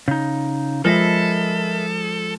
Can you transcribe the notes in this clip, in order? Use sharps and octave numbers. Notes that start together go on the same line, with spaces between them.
C#3 D#4
F3 G#3 A4 A#4 D#5 E5 B5